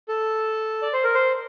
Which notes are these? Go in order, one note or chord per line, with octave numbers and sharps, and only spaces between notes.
A4
D5
C5
A#4
C5